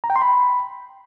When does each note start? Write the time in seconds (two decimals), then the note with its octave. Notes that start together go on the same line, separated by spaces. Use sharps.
0.04 A#5
0.10 G5
0.16 C6
0.22 B5